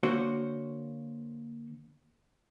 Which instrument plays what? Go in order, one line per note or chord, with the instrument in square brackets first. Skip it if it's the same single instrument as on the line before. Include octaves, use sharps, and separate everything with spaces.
[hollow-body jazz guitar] D3 A#3 F#4 C5 C#5